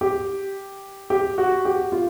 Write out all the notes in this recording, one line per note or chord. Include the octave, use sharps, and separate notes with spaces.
G4
G4
F#4
G4
F4